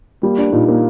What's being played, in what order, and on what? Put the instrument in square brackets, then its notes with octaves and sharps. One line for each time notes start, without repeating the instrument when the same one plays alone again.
[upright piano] G3 [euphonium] A#3
[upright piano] D4
[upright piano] A#2 [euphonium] D#4
[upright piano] A#3